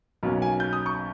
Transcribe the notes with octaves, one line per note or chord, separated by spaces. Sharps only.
B1 B2 A#3 C#4
G#5
G6
D#6
C#6